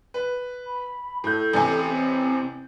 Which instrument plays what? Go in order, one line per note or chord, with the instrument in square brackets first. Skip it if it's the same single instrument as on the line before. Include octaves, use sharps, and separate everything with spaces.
[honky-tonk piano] B4
[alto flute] B5
[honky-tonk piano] A2 G6 [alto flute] A4
[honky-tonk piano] A1 C3 G#5
[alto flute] C4